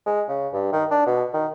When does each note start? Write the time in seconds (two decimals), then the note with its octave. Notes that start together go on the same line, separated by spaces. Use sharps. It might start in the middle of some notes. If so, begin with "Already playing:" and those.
0.06 G#3
0.28 C#3
0.53 G2
0.72 D#3
0.90 D4
1.06 B2
1.34 D#3